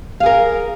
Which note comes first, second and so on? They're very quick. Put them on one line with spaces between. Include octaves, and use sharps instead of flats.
F5 G#4 A#4